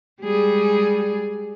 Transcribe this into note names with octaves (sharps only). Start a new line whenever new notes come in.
G3 G#3 G#4